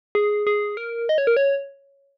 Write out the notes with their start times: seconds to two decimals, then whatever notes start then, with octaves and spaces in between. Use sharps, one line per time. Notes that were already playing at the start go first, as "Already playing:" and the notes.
0.15 G#4
0.47 G#4
0.77 A#4
1.09 D#5
1.18 C#5
1.27 A#4
1.37 C#5